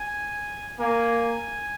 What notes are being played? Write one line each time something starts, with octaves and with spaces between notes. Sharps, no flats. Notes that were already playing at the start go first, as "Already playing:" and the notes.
Already playing: G#5
A#3 G#5